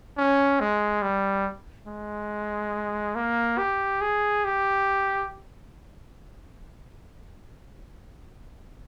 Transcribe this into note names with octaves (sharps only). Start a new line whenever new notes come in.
C#4
G#3
G3
G#3
A#3
G4
G#4
G4